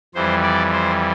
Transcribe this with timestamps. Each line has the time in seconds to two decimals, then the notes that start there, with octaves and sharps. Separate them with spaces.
0.15 F2 E3 G3 C5
0.43 D5
0.72 C5